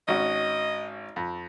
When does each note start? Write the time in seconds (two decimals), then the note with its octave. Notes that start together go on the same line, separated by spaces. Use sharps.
0.08 G#1 C#4 F#4 D#5
1.16 F2